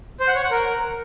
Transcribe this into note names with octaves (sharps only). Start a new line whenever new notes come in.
C5
F#5
C#5
F#5
A#4